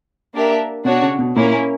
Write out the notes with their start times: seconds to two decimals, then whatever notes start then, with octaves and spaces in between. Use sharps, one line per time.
0.34 A#3 D4 G4 A#4 E5
0.85 B2 D4 F#4 C#5
1.02 C#3
1.19 B2
1.36 A#2 A#3 C#4 E4